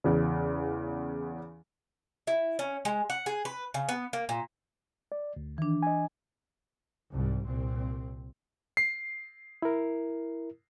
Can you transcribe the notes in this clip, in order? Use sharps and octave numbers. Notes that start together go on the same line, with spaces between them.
E2 C#3
E4
C#4
G#3
F#5
G#4
B4
C#3
B3
A#3
A#2
D5
D2
D#3 E3 D4
D#5 G#5
C2 G#2 G3
C2 A#2 C4
C7
E4 A#4